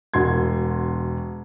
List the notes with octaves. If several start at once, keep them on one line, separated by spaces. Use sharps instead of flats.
E1 F#4 C6 G#6